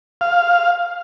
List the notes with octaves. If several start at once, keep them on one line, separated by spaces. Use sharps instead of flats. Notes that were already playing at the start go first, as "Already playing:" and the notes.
F5